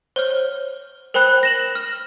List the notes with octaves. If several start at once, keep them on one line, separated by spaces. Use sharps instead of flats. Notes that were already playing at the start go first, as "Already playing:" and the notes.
C5 C#5 F6
A#4 C5 G5 B5 F#6
A#6 E7 F#7
F6